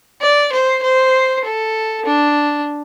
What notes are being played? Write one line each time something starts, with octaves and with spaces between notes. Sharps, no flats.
D5
C5
C5
A4
D4